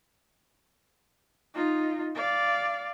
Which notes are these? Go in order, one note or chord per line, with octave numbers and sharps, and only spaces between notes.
D#4 F4
D5 F5